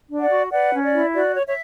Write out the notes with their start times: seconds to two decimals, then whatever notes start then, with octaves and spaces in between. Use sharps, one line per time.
0.09 D4
0.20 D5 F#5
0.30 F#4
0.51 B4 D5 F#5
0.73 C#4
0.83 D5
0.93 E4
1.14 F#4 D5
1.35 C#5
1.46 C#5 E5